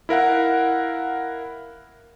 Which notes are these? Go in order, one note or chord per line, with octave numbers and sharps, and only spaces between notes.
E4 A#4 F5 F#5